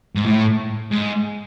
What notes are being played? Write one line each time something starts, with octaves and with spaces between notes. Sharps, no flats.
G#2
A2
G#2